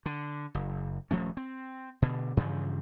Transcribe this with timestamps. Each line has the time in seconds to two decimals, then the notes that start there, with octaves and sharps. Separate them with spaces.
0.06 D3
0.55 F#1
1.11 D#1 F3 A3 C#4
1.37 C4
2.02 B2 D3
2.37 G2 C#3 E3 F3